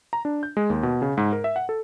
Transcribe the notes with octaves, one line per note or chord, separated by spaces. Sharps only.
A#5
D4
G6
G#3
D#2
B2
C#3
G#2
A#4
E5
F#5
A4